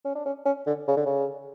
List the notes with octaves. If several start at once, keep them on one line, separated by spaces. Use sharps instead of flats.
C#4
D4
C#4
C#4
D3
C#3
D3
C#3